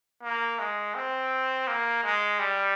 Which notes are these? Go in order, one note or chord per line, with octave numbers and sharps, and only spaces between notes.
A#3
G#3
C4
A#3
G#3
G3